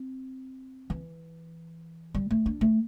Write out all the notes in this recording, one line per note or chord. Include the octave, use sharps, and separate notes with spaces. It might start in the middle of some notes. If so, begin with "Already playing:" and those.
Already playing: C4
E3
G3
A3
D4
A3